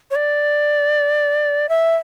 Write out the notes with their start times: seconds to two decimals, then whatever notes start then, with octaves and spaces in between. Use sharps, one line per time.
0.11 C#5
0.16 D5
1.69 E5